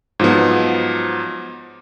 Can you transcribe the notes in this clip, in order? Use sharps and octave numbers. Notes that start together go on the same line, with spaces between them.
G#2 F3 F#3 B3